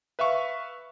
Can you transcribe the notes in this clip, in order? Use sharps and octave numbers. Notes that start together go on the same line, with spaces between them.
B4 E5 F5 C#6